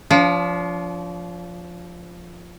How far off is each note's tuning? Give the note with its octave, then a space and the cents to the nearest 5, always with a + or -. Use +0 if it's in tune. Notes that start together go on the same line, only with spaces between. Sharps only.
F3 +0 D4 -40